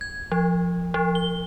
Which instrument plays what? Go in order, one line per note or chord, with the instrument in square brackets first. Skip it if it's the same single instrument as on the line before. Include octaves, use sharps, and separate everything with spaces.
[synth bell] G#6
F3
F3
G7